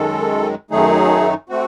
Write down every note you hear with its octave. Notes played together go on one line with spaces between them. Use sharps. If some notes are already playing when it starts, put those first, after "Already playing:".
Already playing: F#2 D#3 G#3 A4
F#2 D#3 F#3 A3 D#4 G#4
A3 C4 F#4